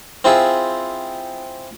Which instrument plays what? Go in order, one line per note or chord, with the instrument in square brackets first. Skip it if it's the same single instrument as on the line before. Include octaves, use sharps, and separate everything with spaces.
[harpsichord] C4 E4 F4 G#4